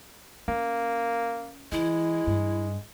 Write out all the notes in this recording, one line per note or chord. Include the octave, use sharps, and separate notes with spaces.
A#3 C#4
E3 G#3 E4
G2